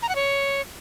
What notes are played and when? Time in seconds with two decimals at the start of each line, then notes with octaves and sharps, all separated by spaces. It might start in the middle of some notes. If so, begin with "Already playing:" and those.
0.02 A#5
0.09 F#5
0.15 C#5